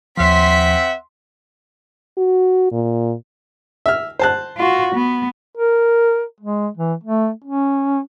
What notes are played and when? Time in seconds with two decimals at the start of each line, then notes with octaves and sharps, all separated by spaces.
0.18 D#2 F3 C4 E5 F#5 C6 B6
2.18 F#4
2.72 A#2
3.86 E5 F6
4.19 C5 A5 F#6
4.57 F4 F#4
4.95 B3
5.57 A#4
6.41 G#3
6.77 E3
7.04 A3
7.44 C#4